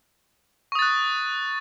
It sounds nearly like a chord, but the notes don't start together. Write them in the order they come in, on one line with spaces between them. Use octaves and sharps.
C#6 D#6 A6 F#6